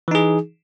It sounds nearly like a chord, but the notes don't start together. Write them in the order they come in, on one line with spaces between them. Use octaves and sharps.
E3 D#4 G#4